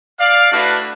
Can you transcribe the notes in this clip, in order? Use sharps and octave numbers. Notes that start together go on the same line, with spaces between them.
D5 F5
A3 D4 E4 F#4 B4